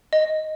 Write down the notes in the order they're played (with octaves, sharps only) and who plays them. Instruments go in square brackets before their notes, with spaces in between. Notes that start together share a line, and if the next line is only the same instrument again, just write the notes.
[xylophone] D#5